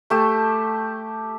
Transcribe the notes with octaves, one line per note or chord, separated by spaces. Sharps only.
A3 G4 A5